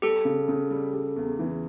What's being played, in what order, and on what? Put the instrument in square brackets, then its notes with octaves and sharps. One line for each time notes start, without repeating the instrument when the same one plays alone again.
[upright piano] G3 [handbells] G4 A4
[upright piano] C#3
C#3
G3
G3
E2
E3